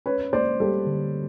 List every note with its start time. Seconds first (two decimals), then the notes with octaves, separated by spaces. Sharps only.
0.06 C#4 B4 C#5
0.33 A#3 C5 D5
0.60 G3 G4 A4
0.86 D3